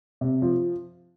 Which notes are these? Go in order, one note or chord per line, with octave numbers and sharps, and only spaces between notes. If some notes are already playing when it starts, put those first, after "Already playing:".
C3
F3